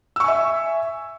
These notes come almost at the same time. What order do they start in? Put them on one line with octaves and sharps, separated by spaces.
E6 C#6 G#5 E5